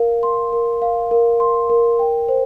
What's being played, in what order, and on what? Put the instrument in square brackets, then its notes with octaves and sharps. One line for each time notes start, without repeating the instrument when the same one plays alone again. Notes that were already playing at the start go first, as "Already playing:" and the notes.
Already playing: [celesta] A#4 F5
C6
A#4
F5
A#4
C6
A#4
G5
C5